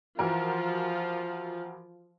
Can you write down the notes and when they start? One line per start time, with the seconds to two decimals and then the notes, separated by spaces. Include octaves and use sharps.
0.19 E3 F3 F4 F#4 A#4